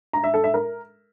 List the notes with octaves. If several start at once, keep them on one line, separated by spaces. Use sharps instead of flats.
A#5
E5
A4
E5
A#4